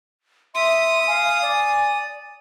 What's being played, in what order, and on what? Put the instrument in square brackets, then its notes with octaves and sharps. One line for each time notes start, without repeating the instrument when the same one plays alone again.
[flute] E5 [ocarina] C6 [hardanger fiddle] D#6
[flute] F5 [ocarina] G#5
[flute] D5